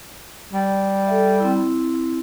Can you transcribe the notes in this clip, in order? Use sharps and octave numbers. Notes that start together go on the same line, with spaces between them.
G3
A4 E5
C4 E4